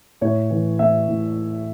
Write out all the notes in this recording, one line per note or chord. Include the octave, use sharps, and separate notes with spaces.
A2 C#5
E3
A2 E5
A2